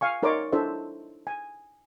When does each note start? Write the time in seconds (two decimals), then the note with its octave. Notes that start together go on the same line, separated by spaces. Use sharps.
0.01 F5 G#5 C#6
0.23 D#4 A#4 C#5 D5 C6 D6
0.52 D4 E4 A4 C5 E5
1.27 G#5